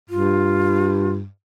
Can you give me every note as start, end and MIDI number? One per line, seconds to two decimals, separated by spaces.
0.10 1.26 43
0.10 1.12 65